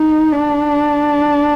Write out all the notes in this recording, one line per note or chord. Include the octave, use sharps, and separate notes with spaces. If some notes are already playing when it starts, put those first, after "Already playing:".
Already playing: D#4
D4